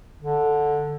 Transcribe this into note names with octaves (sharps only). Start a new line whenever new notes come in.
D3